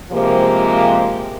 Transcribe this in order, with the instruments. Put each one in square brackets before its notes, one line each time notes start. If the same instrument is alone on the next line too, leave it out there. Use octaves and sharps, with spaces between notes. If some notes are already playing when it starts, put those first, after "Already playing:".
[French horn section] C3 F3 G#3 A#3 G4 C5